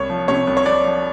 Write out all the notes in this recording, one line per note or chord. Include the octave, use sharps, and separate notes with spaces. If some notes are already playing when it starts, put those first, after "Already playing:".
Already playing: C2 C#5
F3
C3 C#5
C2
C#5
C2 D5
F3